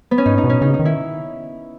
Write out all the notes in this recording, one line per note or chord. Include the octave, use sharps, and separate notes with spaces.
B3
C#4
G#2 D#4
D#4
B2
C#4
C#3 D#4
D#4
D#3
E4